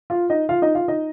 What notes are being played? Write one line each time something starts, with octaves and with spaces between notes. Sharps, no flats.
F4 F5
D#4 D#5
F4 F5
D#4 D#5
F4 F5
D#4 D#5